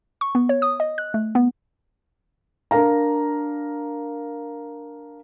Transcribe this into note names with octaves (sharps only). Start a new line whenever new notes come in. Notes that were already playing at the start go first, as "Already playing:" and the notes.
C#6
B3
C#5
D#6
D#5
F#6
A3
B3
D4 A#4 F5 A#5